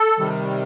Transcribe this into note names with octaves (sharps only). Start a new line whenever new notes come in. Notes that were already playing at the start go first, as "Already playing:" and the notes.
Already playing: A4
C3 D#3 G3